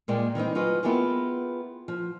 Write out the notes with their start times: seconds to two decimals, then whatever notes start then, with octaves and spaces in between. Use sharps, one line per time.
0.08 A#2 G3 G#3 A#3 G4 D5
0.35 D#3 E3 C4 D#4
0.55 F#3 F4 F#4 G#4 B4 D#5
0.83 B3 E4 F4 G4 G#4 A#4
1.88 F3